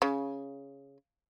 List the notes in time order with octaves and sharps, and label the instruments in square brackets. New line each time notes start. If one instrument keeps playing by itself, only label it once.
[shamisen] C#3